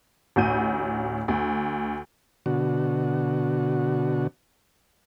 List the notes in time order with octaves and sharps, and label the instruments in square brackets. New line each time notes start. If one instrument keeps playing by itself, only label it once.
[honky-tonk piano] A1 D2 F#4 G6 D#7
D2
[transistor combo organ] B2 D3 F#4